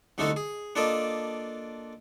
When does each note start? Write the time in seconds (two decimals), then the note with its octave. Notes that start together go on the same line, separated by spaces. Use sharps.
0.18 C2 D3 A3 D#4 F#4 A4
0.36 G#4
0.76 A#3 D4 F4 A4 D5 D#5